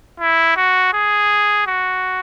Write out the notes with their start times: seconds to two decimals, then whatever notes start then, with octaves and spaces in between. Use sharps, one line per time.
0.20 E4
0.57 F#4
0.93 G#4
1.67 F#4